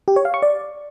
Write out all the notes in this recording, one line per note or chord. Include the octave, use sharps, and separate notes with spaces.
G4
C#5
F5
C#6
D5